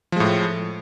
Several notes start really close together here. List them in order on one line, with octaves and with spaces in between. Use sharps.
F3 G#3 A2